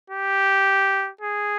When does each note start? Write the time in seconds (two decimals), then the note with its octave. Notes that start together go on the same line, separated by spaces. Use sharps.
0.10 G4
1.21 G#4